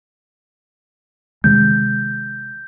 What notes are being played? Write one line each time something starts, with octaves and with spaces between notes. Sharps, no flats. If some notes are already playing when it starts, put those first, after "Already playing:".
C3 D#3 G#3 G6